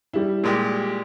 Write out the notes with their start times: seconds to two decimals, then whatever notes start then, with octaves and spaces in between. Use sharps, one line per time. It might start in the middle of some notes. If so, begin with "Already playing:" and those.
0.13 G3 E4
0.44 A#2 G#3 G4